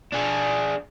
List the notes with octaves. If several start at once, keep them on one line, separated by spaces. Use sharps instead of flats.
D4 G#4